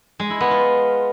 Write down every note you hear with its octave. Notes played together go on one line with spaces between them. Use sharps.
G#3
E4
B3
F4